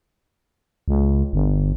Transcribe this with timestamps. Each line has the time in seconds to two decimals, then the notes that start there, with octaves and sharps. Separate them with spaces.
0.88 C#2
1.33 G1